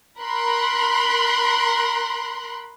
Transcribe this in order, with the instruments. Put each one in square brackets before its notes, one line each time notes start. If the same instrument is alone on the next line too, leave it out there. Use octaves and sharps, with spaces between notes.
[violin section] A#4 B5 C6 F#6